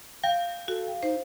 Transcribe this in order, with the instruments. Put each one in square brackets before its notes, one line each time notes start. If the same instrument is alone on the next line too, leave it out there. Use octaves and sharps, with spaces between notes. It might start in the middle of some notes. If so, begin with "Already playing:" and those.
[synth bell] F5 [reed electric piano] G5
[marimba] F#4 [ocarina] A4
[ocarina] D#4 [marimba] C5